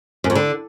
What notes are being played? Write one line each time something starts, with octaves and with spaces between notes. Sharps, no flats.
F#2
F2
D3